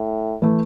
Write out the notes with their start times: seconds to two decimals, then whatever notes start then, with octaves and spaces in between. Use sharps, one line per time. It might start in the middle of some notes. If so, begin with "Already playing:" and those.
Already playing: A2
0.42 E3 A3